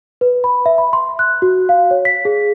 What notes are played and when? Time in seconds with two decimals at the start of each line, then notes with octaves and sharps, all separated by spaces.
0.21 B4
0.44 B5
0.66 E5
0.78 B5
0.93 C6
1.19 F#6
1.42 F#4
1.69 F5
1.91 C#5
2.05 B6
2.25 G#4